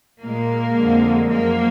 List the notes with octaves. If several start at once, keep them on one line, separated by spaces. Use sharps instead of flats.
A#2 G#3 A#3
F2 D3 G#3
F#2 F3 G#3 A#3